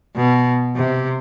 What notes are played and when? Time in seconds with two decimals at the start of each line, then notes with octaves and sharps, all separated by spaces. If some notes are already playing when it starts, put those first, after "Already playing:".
0.16 B2
0.76 C3